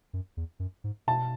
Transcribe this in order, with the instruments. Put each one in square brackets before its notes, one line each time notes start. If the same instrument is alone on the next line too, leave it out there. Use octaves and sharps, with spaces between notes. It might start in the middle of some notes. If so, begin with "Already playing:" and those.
[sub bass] F#2
E2
F#2
G#2
[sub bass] B2 [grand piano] A5